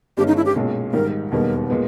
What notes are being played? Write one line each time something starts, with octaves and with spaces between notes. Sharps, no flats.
G1 G2 D#3 G#3 C#4 G4
D#4
E4
G4
B1 A#2 G#3 C#4
G#2 D#3 G3 A#4
E1 D#2 D#3 G3 B3 A#4
A#2 G#3 B3